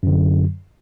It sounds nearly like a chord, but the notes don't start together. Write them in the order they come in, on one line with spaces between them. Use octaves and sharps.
F#2 D3 F#3